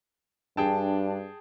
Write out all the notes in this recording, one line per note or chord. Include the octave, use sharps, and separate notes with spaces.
G2 D4 G#4 G5 A5